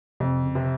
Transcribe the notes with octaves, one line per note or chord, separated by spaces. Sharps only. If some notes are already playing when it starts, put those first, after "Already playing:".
F2 C3
C#3
C3